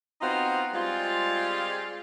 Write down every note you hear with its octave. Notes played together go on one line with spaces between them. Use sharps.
B3 C4 D#4 F4 F#4 C5
G3 G#3 C4 F4